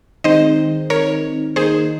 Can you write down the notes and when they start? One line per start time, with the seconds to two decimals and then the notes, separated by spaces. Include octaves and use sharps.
0.24 D#3 G#3 C4 D#4 C5 D#5
0.90 A#4 C#5
1.56 D#3 A#3 D#4 G#4 C5